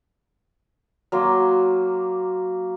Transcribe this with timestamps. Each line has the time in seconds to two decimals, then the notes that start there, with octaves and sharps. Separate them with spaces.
1.12 F#3 A#3 C6 D6